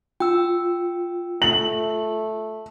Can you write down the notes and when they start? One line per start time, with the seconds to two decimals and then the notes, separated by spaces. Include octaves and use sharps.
0.20 F4 G5 E6
1.42 A3 F#7